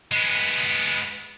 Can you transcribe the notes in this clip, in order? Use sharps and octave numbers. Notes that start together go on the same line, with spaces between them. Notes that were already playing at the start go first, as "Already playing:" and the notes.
G#3 B3